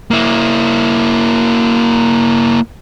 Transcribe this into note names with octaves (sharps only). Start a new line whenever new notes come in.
A#3 E4